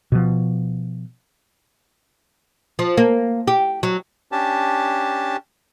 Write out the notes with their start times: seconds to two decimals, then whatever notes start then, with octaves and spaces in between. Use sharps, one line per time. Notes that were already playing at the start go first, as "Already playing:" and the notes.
0.12 B2 F3
2.79 F3
2.97 A#3
3.48 G4
3.83 F#3
4.32 C#4 D4 G4 A5